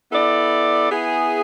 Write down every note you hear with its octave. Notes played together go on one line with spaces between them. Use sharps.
B3 E4 A4 D5
B3 E4 G#4